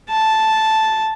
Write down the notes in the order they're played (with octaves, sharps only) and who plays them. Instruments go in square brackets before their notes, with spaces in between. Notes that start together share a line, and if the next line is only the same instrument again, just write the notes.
[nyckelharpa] A5